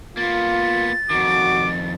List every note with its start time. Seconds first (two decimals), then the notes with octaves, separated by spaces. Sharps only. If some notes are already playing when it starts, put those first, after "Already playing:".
0.17 A#3 B3 F4 A6
1.10 F2 D#3 F#4 D6